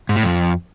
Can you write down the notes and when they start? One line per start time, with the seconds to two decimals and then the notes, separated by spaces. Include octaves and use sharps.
0.09 G#2
0.16 A2
0.23 F2